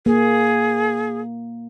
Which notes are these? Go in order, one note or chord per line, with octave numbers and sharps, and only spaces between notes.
A#3 G#4